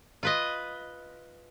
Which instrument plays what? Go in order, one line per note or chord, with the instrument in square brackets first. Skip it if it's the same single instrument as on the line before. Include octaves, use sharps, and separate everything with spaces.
[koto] F4 B4 D#5